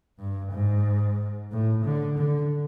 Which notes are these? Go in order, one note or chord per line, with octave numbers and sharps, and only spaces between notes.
G2
G#2
A2
D3
D3